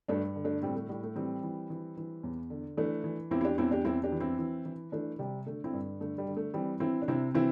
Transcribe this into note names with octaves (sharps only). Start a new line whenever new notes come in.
G2 A3 D4
D3
A3 D4
A2 G3 C4
A3
A2 G3
A3
E3 G3 C4
E3
E3
E3
E2
D3
E3 A3 D4
E3
E2 C4 E4
E4
D4 G4
E2 C4 E4
D4 G4
E2 C4 E4
D4 G4
E3
C4 E4
E3
E3
E3 A3 D4
C3 G3 C4
D3 A3
C4 E4
G2
D3 A3
G3
D3
A3
E3 G3 C4
E3 C4 E4
D4
C3 C4 E4
E3 C4 E4